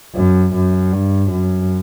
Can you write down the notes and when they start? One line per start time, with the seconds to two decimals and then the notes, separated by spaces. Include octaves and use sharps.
0.15 F#2
0.54 F#2
0.93 G2
1.32 F#2